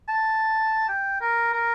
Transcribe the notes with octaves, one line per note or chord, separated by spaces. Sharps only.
A5
G5
A#4
A#4